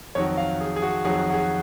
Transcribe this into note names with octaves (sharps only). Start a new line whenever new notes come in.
F2 D#3 F#3 C#5
F5
G#4
G#4
F#4
F2 D#3 F#3 G#4
F#4
G#4